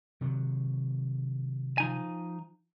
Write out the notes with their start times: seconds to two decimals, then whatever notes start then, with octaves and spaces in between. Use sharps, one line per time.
0.21 C3 D#3 F#3
1.78 F3 D#4 G#5